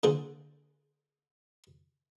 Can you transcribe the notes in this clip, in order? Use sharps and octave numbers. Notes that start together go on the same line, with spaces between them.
D3 A#3 G#4 C5